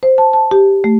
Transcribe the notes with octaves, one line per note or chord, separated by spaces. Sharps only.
C5
A5
A5
G4
A3